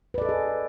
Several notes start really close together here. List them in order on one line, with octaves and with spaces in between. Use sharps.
B4 D5 A4 D#5 G#4